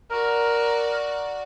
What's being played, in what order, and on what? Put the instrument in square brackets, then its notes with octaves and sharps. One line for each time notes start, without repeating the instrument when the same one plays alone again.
[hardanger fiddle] F#4 D5 [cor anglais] A#4